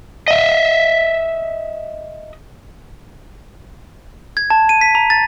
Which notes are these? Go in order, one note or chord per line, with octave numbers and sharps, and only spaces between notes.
D#5 E5
G#6
A5
D#7
B6
A#5
A6